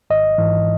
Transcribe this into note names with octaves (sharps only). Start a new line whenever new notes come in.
G#1 D#5
G#2 E3